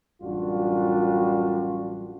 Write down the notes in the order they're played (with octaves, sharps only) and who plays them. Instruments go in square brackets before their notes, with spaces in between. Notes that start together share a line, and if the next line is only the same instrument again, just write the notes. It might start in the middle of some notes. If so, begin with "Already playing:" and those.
[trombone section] A1 F#2 G3 D4 F4 F#4